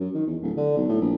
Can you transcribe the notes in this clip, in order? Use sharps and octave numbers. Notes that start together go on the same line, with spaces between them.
F#2
D#3
E2
D1
D3
B1
A2
A#1